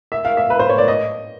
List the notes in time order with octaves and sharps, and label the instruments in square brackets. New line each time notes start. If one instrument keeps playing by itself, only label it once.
[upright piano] E5
F5
E5
B4
C5
C#5
D5
D#5